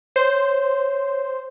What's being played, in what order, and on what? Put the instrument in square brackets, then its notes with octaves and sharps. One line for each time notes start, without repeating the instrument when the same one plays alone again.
[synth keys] C5 [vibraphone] C#5